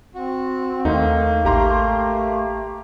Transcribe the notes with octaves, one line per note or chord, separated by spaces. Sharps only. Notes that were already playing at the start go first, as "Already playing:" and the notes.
C4 F#4
D#2 A3 A#3 D#4
A1 A3 G4 A#5 C6